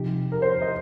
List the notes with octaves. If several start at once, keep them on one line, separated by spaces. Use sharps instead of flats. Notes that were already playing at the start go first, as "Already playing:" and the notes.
Already playing: C3 F3 D#4 G4
A#4
C5
D#5